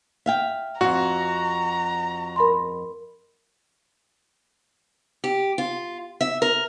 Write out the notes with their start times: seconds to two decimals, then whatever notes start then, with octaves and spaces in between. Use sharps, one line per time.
0.26 E5 F5 G5
0.81 F2 G#2 F#4 A#5
2.36 A#4 B5 C6
5.24 G4
5.58 F4
6.21 E5
6.42 A#4